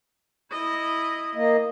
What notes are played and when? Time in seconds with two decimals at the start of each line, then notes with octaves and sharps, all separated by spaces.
0.52 E4 D#5
1.35 A#3 D#5